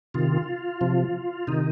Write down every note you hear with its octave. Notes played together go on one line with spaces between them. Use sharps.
C3 D#3 F4
C3 F3
C3 D#3 D#4